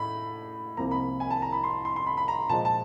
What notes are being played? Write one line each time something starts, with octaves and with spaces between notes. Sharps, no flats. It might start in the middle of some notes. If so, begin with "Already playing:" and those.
Already playing: A2 B5
C2 C3 F3 A#3 A#5
B5
G#5
A5
A#5
B5
C6
C6
C6
B5
B5
A#5
A#2 F3 G#3 A5
A5